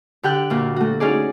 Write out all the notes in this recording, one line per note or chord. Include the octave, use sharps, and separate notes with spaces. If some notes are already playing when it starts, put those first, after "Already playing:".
D3 G4 G5 F#6
D2 A#2
A3 F#4
C#4 D#4 G#4 D5